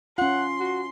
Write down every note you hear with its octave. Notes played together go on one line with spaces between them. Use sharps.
C#4 F4 F#5 C6
F#4